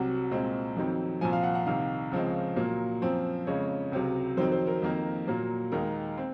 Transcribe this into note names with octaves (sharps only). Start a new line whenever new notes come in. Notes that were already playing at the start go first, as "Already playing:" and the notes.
Already playing: C2 C3 F#3 F#5
C2 A#2 G#3 C4
F2 D#3 F#3 C4
C2 A#2 F3 G#5
F5
F#5
F#5
C2 C3 D#3 F5
C#2 C#3 F3 G#3 C4
A#2 F#3 A#3
F#2 F3 C4
F2 C#3 G#3 C#5
C#2 C3 F#3
F2 D#3 F#3 C4 C5
C5
A#4
F2 D#3 A#3
A#2 F#3 A#3
D#2 D#3 G#3 A#4
C4